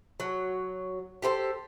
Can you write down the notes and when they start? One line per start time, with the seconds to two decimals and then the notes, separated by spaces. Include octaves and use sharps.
0.20 F#3
1.22 G4 A4 B4 C5